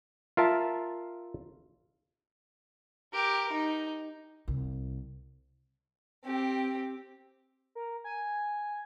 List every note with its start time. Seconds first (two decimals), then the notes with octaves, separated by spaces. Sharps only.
0.37 F4 A#4 E5 A5
3.13 G4 A#4
3.52 D#4
4.48 C2
6.25 C4 G4
7.75 A#4
8.04 G#5